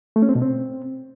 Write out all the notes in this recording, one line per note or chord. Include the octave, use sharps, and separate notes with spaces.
A3
C#4
C4
B2
C4